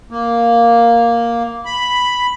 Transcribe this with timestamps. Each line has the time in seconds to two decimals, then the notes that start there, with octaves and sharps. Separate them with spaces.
0.11 A#3
1.66 B5